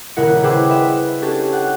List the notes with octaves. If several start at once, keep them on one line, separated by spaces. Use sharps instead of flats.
D#1 C#3 E4 A#4 F#5 C#7
G#4 B4 C5 G5 D6 E6
B4 E5
C#4 D4 G4 A4
F#5 G5